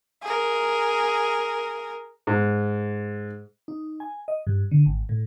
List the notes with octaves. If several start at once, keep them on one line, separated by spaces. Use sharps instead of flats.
G#4 A#4
G#2
D#4
G#5
D#5
G2
D3
G#1
A2